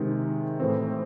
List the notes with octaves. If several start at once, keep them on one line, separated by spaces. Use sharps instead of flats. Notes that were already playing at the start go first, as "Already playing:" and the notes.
Already playing: C3 D#3 G#3 D#4
A2 E3 C4